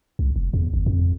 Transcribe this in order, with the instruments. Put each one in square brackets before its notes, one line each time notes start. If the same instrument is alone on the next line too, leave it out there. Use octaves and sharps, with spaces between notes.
[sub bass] C2
F1
E2
G1
F2